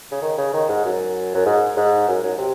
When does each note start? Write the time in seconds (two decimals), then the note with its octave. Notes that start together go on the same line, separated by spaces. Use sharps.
0.11 C#3
0.22 D#3
0.38 C#3
0.53 D#3
0.69 G#2
0.84 F#2
1.34 F#2
1.46 G#2
1.77 G#2
2.08 F#2
2.23 F#2
2.38 C3